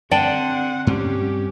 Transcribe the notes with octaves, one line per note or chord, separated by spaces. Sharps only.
D3 C4 D5 F#5 G5 A5
G2 C4 C#4 G4